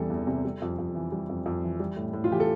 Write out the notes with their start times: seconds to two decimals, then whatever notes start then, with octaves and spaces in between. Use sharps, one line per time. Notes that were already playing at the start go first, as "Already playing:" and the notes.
Already playing: E2 C3 E3 G3 A4
0.10 E2
0.27 C3
0.45 G3
0.62 F2
0.78 F2
0.95 E3
1.12 G3
1.29 F2
1.46 F2
1.64 E3
1.80 G3
1.97 A2
2.13 A2
2.24 F4
2.31 E3 G4
2.40 A4